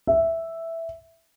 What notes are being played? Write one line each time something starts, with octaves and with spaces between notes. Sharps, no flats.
E5